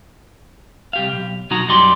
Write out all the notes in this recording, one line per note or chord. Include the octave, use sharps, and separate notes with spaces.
C2 G4 F5
B1
B2 F#3 D#4 F#4 A#5
F#2 G3 D#4 D5 C6